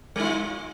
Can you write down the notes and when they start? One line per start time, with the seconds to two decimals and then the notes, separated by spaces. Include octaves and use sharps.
0.16 G3
0.20 D#4
0.23 F4